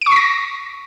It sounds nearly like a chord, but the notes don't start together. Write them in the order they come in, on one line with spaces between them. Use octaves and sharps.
D7 C#6 B6 A#6